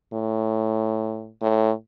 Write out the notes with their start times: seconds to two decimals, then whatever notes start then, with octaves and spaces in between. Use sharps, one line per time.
0.13 A2
1.42 A2